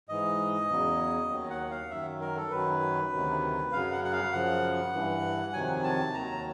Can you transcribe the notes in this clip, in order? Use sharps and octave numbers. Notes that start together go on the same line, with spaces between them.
G#2 E3 D#5
E2 C#3 F#3
D#2 D#3 F#3
F#5
F5
F#2 D#3 F#3 E5
A#4
A4
F#2 D#3 F#3 B4
D2 C3 D#3 F#3
F#2 C#3 F#3 F5
F#5
F#5
F5
F#2 C#3 F3 F#5
G2 E3
F2 C3 D#3 F#3 G#5
A5
D#2 D#3 F#3 A#5